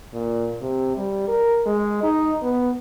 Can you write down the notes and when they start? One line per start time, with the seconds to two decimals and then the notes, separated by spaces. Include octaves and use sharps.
0.14 A#2
0.62 C3
0.97 G3
1.28 A#4
1.66 G#3
2.03 D#4
2.43 B3